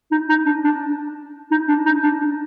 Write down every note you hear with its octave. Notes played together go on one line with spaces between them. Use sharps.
D#4
D#4
D4
D4
D#4
D4
D#4
D4
D4